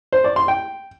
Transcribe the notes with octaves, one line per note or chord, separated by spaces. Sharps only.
C5
D5
C6
G5